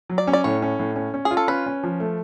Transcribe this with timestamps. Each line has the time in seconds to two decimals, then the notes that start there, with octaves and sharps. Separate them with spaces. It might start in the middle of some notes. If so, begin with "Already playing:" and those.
0.10 F#3
0.18 D5
0.27 C#4
0.33 D5
0.44 A2 C#5
0.62 C#4
0.79 A2
0.96 C#4
1.14 C#4
1.25 G#4
1.31 F4
1.37 A4
1.48 C#4 B4
1.66 C#4
1.84 F3
2.00 A3